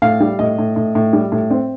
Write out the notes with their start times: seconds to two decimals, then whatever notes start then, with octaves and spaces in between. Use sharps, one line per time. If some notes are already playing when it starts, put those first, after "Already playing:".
0.02 A2 F5
0.20 G3
0.39 A2 D#5
0.59 A2
0.76 A2
0.95 A2
1.13 G3
1.32 A2
1.50 C4